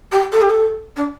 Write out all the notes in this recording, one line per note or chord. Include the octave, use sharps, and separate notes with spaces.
G4
A4
G4
A4
D4